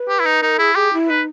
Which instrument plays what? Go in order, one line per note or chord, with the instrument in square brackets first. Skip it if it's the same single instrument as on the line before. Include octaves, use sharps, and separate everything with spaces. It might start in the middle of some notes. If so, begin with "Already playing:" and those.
Already playing: [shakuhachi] B4
[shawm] G4
E4
D#4
[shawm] D#4 [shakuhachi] A#4
[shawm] E4 [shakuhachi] G#4
[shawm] G4 [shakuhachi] G#4
[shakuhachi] E4
[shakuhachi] D#4 [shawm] B4